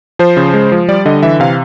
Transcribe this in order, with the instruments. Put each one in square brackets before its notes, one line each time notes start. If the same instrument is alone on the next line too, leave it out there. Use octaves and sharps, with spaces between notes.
[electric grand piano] F3 C5
C#3
G#3
F3
G3 D5
D3 D#5
E3 E5
C3 F5